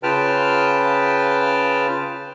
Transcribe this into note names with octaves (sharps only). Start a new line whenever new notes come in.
C#3 F4 B4 G5 A5 F6